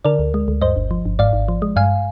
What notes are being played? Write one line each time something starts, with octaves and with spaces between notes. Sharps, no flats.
D3 A#4 D5
D2
G#3
D2
G2 C5 D#5
G1
F3
G1
G#2 D5 F5
G#1
F3
G#3
G2 F5 G#5